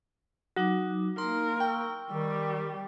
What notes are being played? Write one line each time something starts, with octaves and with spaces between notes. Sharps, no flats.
F#3 D#4 F#4 D6
A#3 D#4 A#4 C6
G5 C#6 E6
D#3 G3 G4